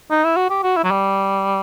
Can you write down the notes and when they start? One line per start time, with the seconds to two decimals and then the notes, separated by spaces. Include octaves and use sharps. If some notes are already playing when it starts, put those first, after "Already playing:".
0.10 D#4
0.24 E4
0.36 F#4
0.50 G4
0.63 F#4
0.77 E4
0.84 F#3
0.91 G3